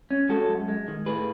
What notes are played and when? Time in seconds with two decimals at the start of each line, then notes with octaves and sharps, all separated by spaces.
0.11 C#4
0.29 G#3 F#4 A4
0.49 F#2
0.68 G#3
0.88 D#3
1.06 A2 G#4 B4